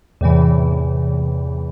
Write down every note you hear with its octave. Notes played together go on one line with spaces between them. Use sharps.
E2 A2 C3 E3